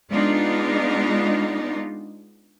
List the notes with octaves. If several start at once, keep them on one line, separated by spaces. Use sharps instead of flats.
G#3 B3 D4 D#4 F4